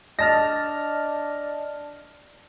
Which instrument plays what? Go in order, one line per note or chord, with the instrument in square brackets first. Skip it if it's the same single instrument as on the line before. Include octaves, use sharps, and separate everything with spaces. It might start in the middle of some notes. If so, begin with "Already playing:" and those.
[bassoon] D4 [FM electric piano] D#5 A5 F6 [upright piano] A#6